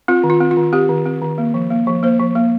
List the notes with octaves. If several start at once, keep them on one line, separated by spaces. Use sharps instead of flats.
C4 F4
D#3
F4
C4
F4
D#3
C4 G4
D#3
C4
D#3
A#3
F3
A#3
F3
A#3 C5
F3
A#3